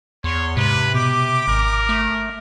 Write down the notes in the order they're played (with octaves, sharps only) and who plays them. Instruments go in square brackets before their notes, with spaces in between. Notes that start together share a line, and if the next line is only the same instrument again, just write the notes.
[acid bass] E2 [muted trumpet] C#5 [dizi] C6
[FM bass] G#2 [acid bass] C3 [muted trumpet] B4
[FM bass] B2 [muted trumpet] G4 [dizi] D6
[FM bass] G#1 [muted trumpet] A#4
[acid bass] A3